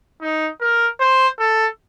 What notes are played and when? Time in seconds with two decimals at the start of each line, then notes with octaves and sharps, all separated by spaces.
0.21 D#4
0.61 A#4
1.00 C5
1.39 A4